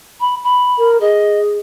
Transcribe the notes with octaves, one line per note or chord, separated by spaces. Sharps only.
B5
B5
A#4
G#4 D#5